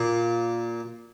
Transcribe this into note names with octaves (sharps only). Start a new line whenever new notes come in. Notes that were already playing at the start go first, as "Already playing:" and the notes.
Already playing: A#2